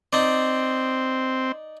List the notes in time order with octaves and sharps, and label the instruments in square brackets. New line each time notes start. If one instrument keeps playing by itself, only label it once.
[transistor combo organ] C4 [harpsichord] D#4 D5